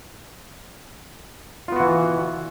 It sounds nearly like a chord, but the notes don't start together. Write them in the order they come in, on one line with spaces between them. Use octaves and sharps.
F4 B3 F#4 E3